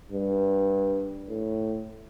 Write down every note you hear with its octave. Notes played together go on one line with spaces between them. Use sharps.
G2
A2